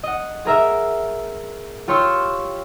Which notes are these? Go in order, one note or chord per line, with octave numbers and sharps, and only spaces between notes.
D#5 F#5
G#4 A#4 E5
F4 G4 C#5 C6 C#6 E6